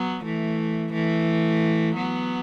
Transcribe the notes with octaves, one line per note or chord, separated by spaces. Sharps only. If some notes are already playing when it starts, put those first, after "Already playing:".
Already playing: F#3 B3
E3 A3
E3 A3
F#3 B3